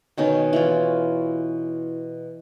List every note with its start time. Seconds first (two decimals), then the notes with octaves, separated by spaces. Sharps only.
0.18 B2 D#3 C#4
0.53 E3 E4 F4